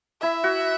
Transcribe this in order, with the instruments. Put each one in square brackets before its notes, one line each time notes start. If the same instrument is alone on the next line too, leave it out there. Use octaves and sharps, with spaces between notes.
[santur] E4 [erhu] E5
[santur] F#4